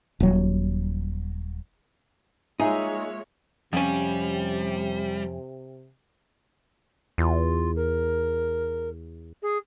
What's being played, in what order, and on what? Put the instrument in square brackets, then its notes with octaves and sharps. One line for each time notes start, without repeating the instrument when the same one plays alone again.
[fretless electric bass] D#1 F#3
[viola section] G#3 A#3 C#5 [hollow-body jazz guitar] D#4 [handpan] F4 E5 [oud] G#4
[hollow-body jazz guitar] F2 C#4 [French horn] C3 [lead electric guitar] G3
[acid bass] E2 [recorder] F4
[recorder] A#4
G#4